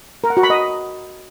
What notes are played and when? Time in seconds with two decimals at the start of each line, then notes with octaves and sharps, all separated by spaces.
0.24 A#4
0.30 F#5
0.37 F#4
0.43 B5
0.50 D#5